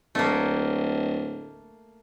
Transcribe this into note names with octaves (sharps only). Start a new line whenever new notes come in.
D1 A3 A#3